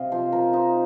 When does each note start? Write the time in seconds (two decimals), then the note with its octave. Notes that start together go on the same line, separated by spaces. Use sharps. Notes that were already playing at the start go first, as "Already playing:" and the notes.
Already playing: C3 C4 D#5 F5
0.12 F3 C5
0.32 F3 A#4
0.53 D#4 C5